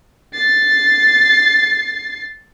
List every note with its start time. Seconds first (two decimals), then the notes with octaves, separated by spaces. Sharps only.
0.34 A6 C7